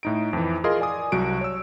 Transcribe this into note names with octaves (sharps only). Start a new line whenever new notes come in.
A2 D#4 D7
F2 E3
F4 G#4 A#4 D#5 F5 C6
D5 G#5 D#6
C2 F#3 F#4 D7
C#5 E6